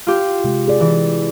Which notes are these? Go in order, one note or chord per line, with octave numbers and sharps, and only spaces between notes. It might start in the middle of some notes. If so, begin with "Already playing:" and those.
F4 G4
C3 G#3
G#4 D5
E3